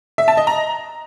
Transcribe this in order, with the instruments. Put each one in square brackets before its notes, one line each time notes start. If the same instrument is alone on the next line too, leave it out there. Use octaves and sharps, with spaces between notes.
[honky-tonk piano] E5
A5
D#5
A#5